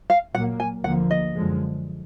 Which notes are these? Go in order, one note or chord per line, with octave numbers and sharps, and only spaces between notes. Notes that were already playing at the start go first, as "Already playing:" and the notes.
F5
A#2 F#3 A#3 F#5
G#5
D2 D3 F3 A#3 F#5
D#5
F#2 D3 F3 G#3